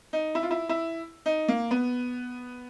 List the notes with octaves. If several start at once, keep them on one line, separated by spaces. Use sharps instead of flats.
D#4
E4
F4
E4
E4
D#4
A#3
B3